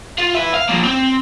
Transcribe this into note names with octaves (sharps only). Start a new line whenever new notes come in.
F4
B4 E5
F5
F3 A#3
C4